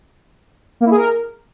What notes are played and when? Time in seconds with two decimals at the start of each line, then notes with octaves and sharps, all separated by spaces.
0.81 A#3
0.86 E4
0.91 G#4
0.96 A#4